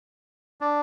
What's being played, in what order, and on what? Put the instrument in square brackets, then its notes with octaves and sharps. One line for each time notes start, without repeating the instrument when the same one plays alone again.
[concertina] D4